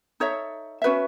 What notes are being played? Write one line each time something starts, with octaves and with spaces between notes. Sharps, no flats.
D#4 A4 C#5 E5
C#4 F#4 B4 E5